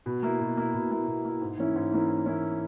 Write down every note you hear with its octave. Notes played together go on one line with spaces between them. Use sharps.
B2
A#3 E4
B2
A#3 E4
B2
A#3 E4
B2
A#3 E4
G#2
E3 A#3 C#4 E4
G#2
E3 A#3 C#4 E4
G#2
E3 A#3 C#4 E4